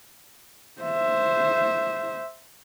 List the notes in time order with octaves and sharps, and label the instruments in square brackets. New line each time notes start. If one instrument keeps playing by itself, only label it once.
[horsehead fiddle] C5 E5